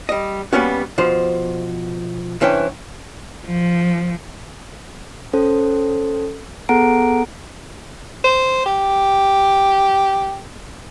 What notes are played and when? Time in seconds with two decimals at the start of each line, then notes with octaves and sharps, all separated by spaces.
0.09 G3 D#5
0.53 G3 A#3 B3 C#4 F#4
0.98 B2 F3 C5
2.41 C2 E3 C#4 D4 G5
3.46 F3
5.33 C#4 A4 C5
6.69 B3 G#4 A4 F#5 A#5 D7
8.24 C5
8.66 G4